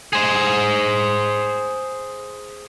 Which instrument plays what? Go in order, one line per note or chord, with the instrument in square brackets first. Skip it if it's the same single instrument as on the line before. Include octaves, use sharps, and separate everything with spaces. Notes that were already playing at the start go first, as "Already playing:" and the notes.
[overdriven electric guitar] G#4 C5